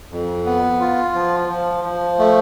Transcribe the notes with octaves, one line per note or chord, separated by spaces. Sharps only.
F2
B3
F4
F3
F3
F3
A3